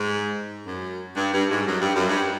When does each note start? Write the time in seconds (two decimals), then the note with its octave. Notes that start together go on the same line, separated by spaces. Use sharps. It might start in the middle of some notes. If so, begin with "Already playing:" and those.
Already playing: G#2
0.66 F#2
1.16 G2
1.33 G2
1.50 G#2
1.66 F#2
1.81 G2
1.95 F#2
2.08 G2